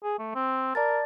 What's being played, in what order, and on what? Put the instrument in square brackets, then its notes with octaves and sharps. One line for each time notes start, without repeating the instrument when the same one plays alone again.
[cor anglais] G#4
A3
C4
[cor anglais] A#4 [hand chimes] D5 A5 A6